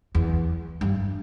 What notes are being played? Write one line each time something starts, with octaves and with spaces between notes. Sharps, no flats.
E2
G2